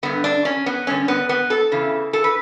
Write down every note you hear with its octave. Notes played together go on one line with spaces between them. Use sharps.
G2 D3 B3
D4
C#4
B3
G2 D3 C#4
B3
B3
A4
E2 C#3 E3
A4
B4